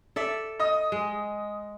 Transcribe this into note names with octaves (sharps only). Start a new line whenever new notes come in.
A4 D5 E5
D#5 D#6
G#3